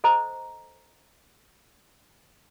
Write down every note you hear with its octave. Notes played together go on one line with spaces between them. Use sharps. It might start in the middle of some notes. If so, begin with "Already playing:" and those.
A4 C5 D#5 A#5